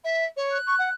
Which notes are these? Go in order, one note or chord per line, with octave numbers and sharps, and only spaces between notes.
E5
C#5
F#6
C#6
F#5